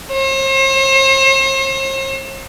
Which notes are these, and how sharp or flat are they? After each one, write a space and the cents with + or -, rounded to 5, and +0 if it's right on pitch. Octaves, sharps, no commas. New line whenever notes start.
C5 +45